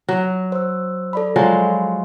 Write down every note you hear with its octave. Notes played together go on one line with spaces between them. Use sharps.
F#3
C5 E6
A4 D5 B5
F3 F#3 G#3